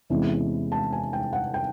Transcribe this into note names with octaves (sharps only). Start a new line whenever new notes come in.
E2 C3 E3 G#3 C#4
A5
G#5
G5
F#5
G5